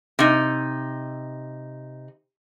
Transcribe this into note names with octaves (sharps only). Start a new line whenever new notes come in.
C3 D#4